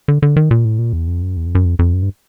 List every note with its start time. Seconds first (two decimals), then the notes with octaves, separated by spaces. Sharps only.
0.08 D3
0.22 D3
0.36 D#3
0.51 A#2
0.65 A2
0.79 A#2
0.93 E2
1.08 F2
1.22 F#2
1.37 E2
1.46 F2
1.55 F#2
1.65 F2
1.79 F2
1.94 F#2
2.03 G2